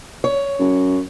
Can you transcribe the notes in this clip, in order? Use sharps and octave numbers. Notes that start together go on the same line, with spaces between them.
C#5
F#2